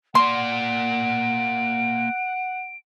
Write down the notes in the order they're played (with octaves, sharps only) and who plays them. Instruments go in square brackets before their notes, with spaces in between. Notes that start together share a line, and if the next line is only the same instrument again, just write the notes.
[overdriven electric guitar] A#3 D5 [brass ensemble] F#5 [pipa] C6 [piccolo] D7